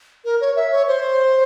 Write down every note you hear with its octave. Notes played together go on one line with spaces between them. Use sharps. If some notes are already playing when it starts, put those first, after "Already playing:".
A#4
C#5
E5
C#5
C5